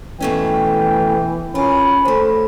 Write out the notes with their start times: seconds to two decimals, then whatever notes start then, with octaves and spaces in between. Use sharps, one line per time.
0.20 B2 E3 A3 C#4 G5
1.55 C#4 F4 A#4 B5
2.05 D2 A3 C5